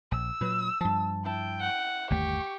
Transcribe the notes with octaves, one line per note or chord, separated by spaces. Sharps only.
A#1 E6
A#2 F#3 B4
G2 F3 A5
E4 E5 G5 A5
F#5
G1 D#2 A3 G4 C#6